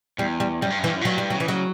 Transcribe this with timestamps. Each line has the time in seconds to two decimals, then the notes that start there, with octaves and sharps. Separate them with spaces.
0.18 E2 G3
0.40 G3
0.62 F#2 G3
0.70 G2
0.79 F#2
0.84 E3
0.87 G2
0.95 F#2
1.01 A#2
1.05 G2 F#3
1.18 G3
1.30 F#3
1.34 C#3
1.40 E3
1.48 F#3